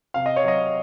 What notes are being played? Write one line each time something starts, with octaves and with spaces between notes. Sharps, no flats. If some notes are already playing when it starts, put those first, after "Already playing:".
C3 F5
D#5
C#5
F#3 D#5